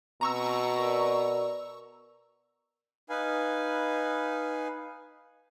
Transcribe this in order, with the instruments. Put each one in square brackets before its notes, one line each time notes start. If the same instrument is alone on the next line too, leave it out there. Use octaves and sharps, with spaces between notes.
[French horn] B2 [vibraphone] C4 [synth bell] A#5 C#6 E6
[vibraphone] A#4 D5
[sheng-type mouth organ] D#4 B4 F5 G#5